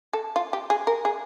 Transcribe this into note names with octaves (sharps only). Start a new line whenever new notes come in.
A4
F4
G4
G#4
A#4
G#4